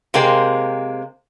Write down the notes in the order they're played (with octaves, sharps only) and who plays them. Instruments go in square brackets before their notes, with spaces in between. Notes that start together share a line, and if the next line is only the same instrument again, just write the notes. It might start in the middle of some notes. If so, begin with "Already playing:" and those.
[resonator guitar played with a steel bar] C3 G#3 A#3 C4